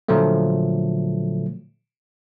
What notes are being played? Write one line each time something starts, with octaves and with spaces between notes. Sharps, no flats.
A#2 D3 F3 F#3 A3